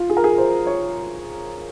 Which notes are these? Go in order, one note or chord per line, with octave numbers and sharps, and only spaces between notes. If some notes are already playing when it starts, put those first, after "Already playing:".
Already playing: F4
G#4
A#4
G#4
C5
C#5